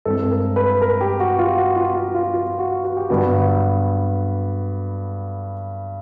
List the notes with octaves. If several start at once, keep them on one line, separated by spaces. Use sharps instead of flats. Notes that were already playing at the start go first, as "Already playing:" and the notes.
G2 E3 G#3 C4 A4
A4
A#4
B4
A#4
G4
F#4
F4
F#4
F4
F4
F4
F4
F#4
F#4
G4
G2 D3 F#3 B3 F#4